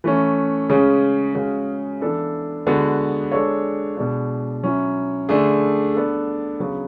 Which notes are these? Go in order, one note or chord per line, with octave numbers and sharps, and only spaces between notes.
E3 A3 C#4
C#3 G#3 C#4
C#3 G#3 C#4 F#4
E3 B3 D4 A4 D5
D3 G#3 B3 F#4
G#3 D4 A4 C#5
B2 G#3 B3 D4
F#3 C#4 E4
D3 A3 D4 G#4
B3 D4 A4
C#3 F#3 B3